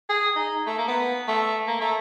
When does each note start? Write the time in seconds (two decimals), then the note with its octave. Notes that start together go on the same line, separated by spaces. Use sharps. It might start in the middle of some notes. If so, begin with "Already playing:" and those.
0.09 G#4
0.36 D#4
0.67 A3
0.77 A#3
0.88 B3
1.28 A3
1.67 A#3
1.81 A3